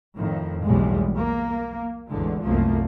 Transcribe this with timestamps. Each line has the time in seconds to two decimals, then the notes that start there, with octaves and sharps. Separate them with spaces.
0.15 F2 A2 D#3
0.64 B1 E2 A2 G3 G#3
1.15 A#3
2.09 A1 E2 D3 G#3
2.44 C2 F#2 F3 A3 A#3